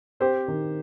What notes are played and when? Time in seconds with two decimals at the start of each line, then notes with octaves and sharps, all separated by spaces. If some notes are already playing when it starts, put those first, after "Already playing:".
0.20 C4 G4 C5
0.48 D#3